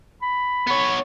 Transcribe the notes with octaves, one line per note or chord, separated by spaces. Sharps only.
B5
B3 C#5